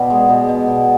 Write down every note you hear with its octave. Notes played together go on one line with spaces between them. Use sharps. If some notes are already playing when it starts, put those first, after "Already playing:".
Already playing: B2 B3 D5
G#3
B2
B2
B2